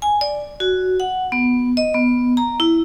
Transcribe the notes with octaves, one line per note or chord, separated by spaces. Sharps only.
G#5
D5
F#4
F#5
B3
D#5
B3
A#5
E4